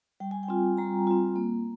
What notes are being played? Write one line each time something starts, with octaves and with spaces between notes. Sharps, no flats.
G3 G5
G#5
G5
C4 F4
G3 A#5
C4 F4
A#3